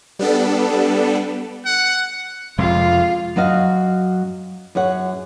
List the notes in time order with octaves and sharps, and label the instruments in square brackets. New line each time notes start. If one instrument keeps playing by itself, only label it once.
[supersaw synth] G3 B3 D4 A4
[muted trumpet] F#5
[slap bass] F2 C3 G#3 [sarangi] F4
[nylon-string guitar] F#2 F#3 F#4 D#5 F5
F#2 G#4 C#5 F#5